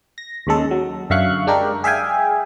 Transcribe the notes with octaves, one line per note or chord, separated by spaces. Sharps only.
A#6
D#2 C#3 G#3 A4
F#3
F#2 D3 E5 F5 C#6 F#6
G#3 D4 G4 A#4
G#4 E5 F5 G5 G#5